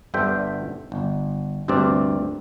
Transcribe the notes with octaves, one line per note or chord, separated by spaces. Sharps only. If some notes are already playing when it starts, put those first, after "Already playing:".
G1 G2 D3 C5 E5 G5
G1
D2 G2 C3 C4 D5